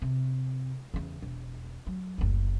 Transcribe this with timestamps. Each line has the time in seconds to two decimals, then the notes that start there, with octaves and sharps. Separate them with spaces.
0.02 C3
0.94 E2 C#3
1.22 E1
1.87 F#3
2.18 F#1 D2